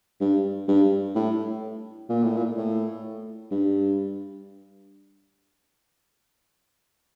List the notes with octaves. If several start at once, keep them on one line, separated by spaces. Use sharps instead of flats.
G2
G2
A2
A#2
A2
A#2
A2
G2